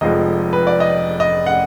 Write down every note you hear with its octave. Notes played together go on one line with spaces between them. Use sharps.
F1 F2 F3 G#3 D#5
B4
D5
D#5
D#5
F#5